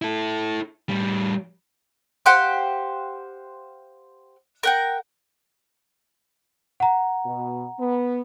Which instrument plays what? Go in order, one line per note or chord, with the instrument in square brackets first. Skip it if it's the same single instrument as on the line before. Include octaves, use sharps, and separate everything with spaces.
[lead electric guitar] E4 A4
A2 G3
[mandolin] G4 C5 F5 F#5
A#4 F#5 G5
[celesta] F#5 A#5
[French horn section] B2
B3